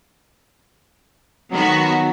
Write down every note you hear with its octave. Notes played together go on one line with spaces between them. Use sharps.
D#3 F#3 B3 F#4